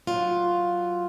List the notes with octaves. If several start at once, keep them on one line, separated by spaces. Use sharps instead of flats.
F#3 F4